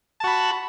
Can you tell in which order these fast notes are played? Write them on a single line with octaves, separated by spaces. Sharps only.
A5 F#4 B5